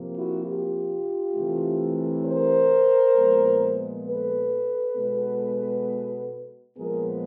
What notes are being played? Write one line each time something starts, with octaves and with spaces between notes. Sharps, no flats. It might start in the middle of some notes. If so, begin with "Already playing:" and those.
Already playing: C3 F3 A#3
E4 F#4
F4 G4
C3 E3 A3
A#4 C5
A#2 F3 G#3 B3
A4 B4
B2 G#3 B3
A#2 F3 G#3 B3 G#4 A#4